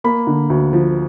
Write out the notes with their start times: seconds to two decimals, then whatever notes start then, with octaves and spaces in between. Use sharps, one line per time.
0.04 A#3 B5
0.27 D3
0.50 D2
0.73 F3